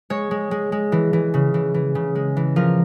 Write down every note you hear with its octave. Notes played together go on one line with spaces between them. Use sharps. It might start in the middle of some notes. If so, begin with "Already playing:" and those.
G#3 C#5
G#3
G#3
G#3
E3
E3
C#3
E3
E3
C#3
G#3
E3
F3 A#4